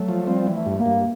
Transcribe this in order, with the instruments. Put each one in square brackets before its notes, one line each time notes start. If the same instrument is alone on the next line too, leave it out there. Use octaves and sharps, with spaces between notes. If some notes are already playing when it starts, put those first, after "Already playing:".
Already playing: [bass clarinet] F#3 [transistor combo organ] A3
[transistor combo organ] F3
[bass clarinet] G3 [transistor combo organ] C4
[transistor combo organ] E3
[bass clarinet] A3
[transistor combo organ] G2
[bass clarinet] A#3
[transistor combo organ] G2